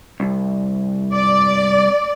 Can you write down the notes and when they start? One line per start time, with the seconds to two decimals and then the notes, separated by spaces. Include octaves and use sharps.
0.20 C2
1.14 D5